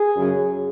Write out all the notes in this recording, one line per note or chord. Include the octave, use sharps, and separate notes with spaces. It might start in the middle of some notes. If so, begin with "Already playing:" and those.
Already playing: G#4
F#2 C#3 F#3